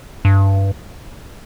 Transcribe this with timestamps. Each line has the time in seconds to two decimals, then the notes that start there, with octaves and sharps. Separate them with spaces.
0.25 G2